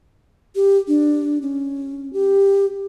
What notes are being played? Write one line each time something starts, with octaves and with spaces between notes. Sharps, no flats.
G4
D4
C#4
G4